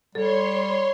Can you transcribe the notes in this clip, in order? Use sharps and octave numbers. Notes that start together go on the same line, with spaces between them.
G3 A4 C#5 C6